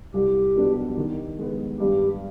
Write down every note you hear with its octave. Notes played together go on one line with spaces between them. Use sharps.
C2 G4
B2 G3 B3 D4
D#3
G#3 B3
G2 G4